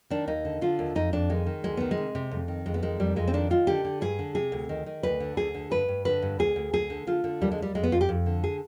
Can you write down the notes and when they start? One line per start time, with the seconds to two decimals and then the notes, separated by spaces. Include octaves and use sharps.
0.10 D#3 D4
0.28 D#2 D#4
0.45 D3
0.61 D3 F4
0.79 D#2
0.95 F2 D#4
1.13 F2 D4
1.30 D#3 G#3
1.46 D#3
1.64 D2 G#3
1.77 D#3 B3
1.91 G#3
1.97 C3
2.15 C3
2.31 F2
2.48 D#3
2.66 F2 G#3
2.74 B3
2.83 D#3 G#3
3.00 F2 G3
3.16 F2 G#3
3.28 C4
3.33 D#3 D4
3.50 D#3 F4
3.67 D3 G4
3.85 D3
4.01 G2 G#4
4.19 D3
4.35 C3 G#4
4.52 D2
4.69 D#3
4.86 D#3
5.03 D2 B4
5.20 D3
5.37 D2 G#4
5.55 D3
5.71 G2 B4
5.88 G2
6.05 D3 B4
6.22 G2
6.39 D2 G#4
6.56 D2
6.73 D2 G#4
6.90 D3
7.07 D3 F4
7.24 D3
7.41 D#2 G3
7.52 G#3
7.58 D#2 G3
7.75 F2 G#3
7.83 B3
7.92 F2 F4
8.01 G4
8.09 F2
8.26 D3
8.44 G#4